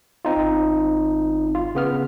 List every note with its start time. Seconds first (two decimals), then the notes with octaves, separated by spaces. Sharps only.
0.25 C4 D#4 F4
0.36 G#1
1.55 F4
1.75 C#3 B3 F6